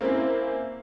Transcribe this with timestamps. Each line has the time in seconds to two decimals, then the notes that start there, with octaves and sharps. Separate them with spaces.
0.01 A#3 C4 C#4 E4